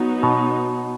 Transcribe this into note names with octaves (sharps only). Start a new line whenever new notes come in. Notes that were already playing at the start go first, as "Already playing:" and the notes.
Already playing: F#3 B3 D#4 F#4
B2